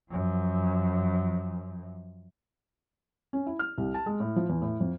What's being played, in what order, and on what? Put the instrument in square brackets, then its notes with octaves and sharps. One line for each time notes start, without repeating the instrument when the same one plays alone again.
[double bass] F#2 F3
[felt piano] C#4
E4
F6
C2
A5
G#3
A2
F3
E2
A2
F2